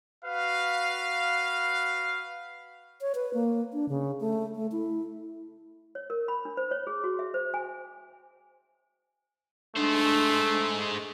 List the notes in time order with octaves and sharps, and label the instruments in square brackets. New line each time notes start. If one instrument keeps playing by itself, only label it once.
[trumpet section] F#4 B4 F5
[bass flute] C#5
B4
A#3
D4
C#3
A3
A3
E4
[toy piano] C#5
A#4
B5
D4
C5
C#5
G#4
F#4
E5
C5
G#5
[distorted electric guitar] G#3 C5 [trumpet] A3 [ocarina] D4